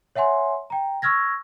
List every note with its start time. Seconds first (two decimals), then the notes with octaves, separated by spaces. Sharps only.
0.16 C#5 E5 F#5 G#5 C6
0.70 G5 A#5
1.02 C#6 E6 F6 G#6 A#6